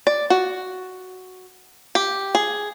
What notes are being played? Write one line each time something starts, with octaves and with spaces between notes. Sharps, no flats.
D5
F#4
G4
G#4